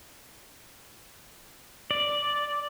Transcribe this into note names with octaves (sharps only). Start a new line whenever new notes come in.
D5